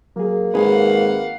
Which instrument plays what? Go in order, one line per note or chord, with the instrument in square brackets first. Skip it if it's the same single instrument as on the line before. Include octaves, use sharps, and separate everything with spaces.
[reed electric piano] F#3 G#4 [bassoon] A#3
[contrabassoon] G#1 [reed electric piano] G#4 B4 [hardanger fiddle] F5 F#5